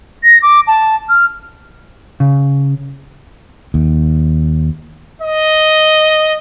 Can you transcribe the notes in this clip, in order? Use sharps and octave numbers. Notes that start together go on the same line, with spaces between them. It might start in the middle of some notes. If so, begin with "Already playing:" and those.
A#6
D6
A5
F6
C#3
D#2
D#5